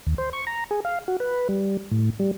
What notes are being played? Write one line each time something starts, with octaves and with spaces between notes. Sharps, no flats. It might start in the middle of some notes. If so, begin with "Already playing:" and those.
D#2
C5
C#6
A#5
G#4
F5
F#4
B4
G3
A2
G3